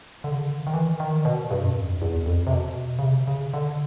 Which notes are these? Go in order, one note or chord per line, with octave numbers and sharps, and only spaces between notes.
D3
C#3
D3
D#3
D#3
E3
D#3
B2
G2
F#2
F2
E2
F2
C3
B2
C#3
C3
C#3
D3